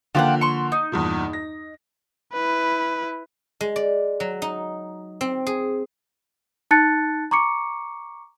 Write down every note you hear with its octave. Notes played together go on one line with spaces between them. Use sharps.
D3 F3 A#3 F4 G4 F#5
C6 C#6
D#4
E2 G2 A#2
A#6
E4 B4
G#3
D5
F#3
D#4
C4
G#4
D#4 A5 F#6 A6 C#7
A#5 C#6 D6 C#7